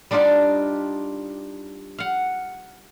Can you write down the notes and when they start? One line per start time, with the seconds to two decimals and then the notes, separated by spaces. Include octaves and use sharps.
0.11 G3 D4 D#4 F4 G4 D5
1.98 F5 F#5